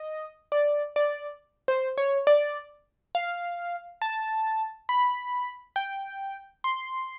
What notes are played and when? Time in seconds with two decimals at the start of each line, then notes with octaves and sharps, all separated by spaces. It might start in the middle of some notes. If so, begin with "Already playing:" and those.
Already playing: D#5
0.52 D5
0.96 D5
1.68 C5
1.98 C#5
2.27 D5
3.15 F5
4.02 A5
4.89 B5
5.76 G5
6.64 C6